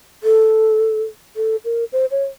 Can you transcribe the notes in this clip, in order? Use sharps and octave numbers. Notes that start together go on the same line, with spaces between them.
A4
A4
A#4
C5
C#5